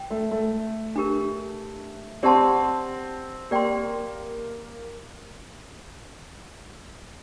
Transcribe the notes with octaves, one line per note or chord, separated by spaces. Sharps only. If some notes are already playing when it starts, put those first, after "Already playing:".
Already playing: G5
A3
A3
D4 G4 A#4
C4 G4 D5 F#5 A5 C6
A#3 G4 D5 G5 C6